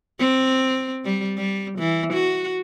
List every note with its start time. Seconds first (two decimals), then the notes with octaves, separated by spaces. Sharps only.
0.19 C4
1.05 G3
1.37 G3
1.79 E3
2.13 F#4